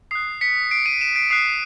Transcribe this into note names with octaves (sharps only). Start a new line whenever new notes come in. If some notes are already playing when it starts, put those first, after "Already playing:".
D#6 F#6 C7
B6 C#7
C7 D7
C#7 D#7
D7 E7
C7 D7
D#6 F#6 C7